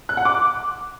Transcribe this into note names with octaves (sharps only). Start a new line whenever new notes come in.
F#6
F#5
D6